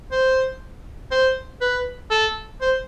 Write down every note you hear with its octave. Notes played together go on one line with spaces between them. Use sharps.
C5
C5
B4
A4
C5